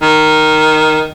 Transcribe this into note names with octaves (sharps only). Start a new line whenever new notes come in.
D#3